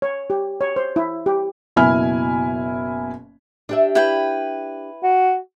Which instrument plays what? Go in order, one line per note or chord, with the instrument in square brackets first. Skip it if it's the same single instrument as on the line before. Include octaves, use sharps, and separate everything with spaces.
[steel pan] C#5
G4
C#5
C5
E4
G4
[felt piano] F#1 B2 E4 G#5 B5 F6
[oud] D4 G4 E5
[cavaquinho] E4 B4 G5
[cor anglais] F#4